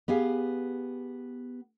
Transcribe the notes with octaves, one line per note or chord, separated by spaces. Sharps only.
B3 G4 G#4 F5